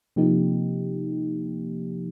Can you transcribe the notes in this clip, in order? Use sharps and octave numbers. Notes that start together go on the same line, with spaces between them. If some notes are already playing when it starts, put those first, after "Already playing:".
C3 F3 A#3 D#4 G4